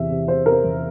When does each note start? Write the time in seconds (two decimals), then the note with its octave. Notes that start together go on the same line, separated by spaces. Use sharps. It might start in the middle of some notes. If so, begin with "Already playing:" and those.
Already playing: E2 C3 E3 E5
0.10 C3
0.28 C3 C5
0.46 C3 A#4
0.52 C5
0.64 E2